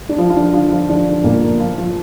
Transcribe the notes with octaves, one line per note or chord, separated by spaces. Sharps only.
D4
F3 F4
F4
D3 D4
F3 F4
F3 F4
D3 D4
A#2 A#3
F3 F4
F3 F4